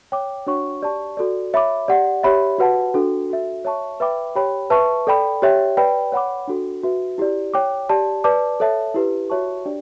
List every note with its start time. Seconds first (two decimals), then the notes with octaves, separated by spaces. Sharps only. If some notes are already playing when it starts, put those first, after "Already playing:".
0.12 C#5 G5 D6
0.47 D4 F#4 C#5 F#5 C#6
0.82 G4 D5 A5 C#6
1.17 F#4 A4 D5
1.54 C#5 E5 B5 D6
1.88 G4 D5 F#5
2.23 G4 C#5 E5 B5
2.58 F#4 B4 F#5 A5
2.94 D4 F#4 A4
3.30 F#4 A4 E5
3.65 C#5 E5 A5 C#6
4.00 B4 E5 G5 B5 D6
4.35 G4 C#5 G5 B5
4.70 B4 E5 A5 C#6
5.07 A4 D5 G5 B5
5.42 G4 C#5 E5 G5
5.77 B4 D5 G5 B5
6.12 C#5 F#5 B5 D6
6.47 D4 F#4 A4
6.83 F#4 B4 E5
7.18 E4 G4 D5
7.54 C#5 G5 D6
7.89 G4 D5 A5
8.24 B4 D5 A5 D6
8.60 A4 C#5 E5 A5
8.94 E4 G4 B4
9.30 F#4 C#5 E5 A5 C#6
9.65 D4 G4 D5